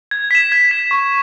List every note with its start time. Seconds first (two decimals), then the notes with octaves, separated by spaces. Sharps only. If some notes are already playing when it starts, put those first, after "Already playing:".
0.11 G#6
0.31 B6 E7
0.52 G#6
0.71 B6 E7
0.91 C#6